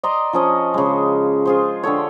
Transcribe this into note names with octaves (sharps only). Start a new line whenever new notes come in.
D5 D#5 A#5 C6
F3 C#4 D#5
C#3 G#3
F4 G#4 C5
D3 G4 A4 C#5